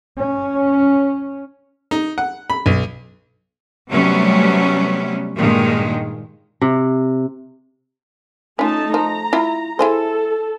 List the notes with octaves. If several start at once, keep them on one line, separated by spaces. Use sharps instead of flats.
C#4
D#4
F#5
B5
B1
C3 F#3 G3 A3 B3 C#4
G2 A#2 D#3 G#3
C3
A3 C#4 D#4 F4 A5
F3 A#5
E4 F4
E4 G#4 A4 C5